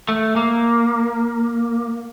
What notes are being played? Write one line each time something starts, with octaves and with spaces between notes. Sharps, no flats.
A3
A#3